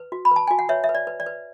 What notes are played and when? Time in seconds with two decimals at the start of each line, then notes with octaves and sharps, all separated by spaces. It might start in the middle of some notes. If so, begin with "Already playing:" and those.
Already playing: B4
0.12 F#4
0.25 B5
0.31 B4 A5
0.47 F#4 G#5
0.59 F#5
0.69 B4 C#5 E5
0.84 E5
0.89 B4
0.95 D5
1.07 B4
1.20 D5
1.26 B4